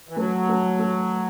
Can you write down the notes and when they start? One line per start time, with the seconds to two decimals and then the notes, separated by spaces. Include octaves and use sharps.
0.09 E3
0.16 F#3 A3
0.49 A3
0.79 A3